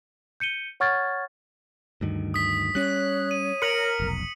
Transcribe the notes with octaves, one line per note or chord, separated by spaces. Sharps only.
G6 C#7 D#7 G7
C#5 F#5 C#6 F6 G#6 A6
D2 G2 D#3
D#6 B6
G3 C#4 C#5 F#6
D#7
A#4 C#7 F#7
F1 B1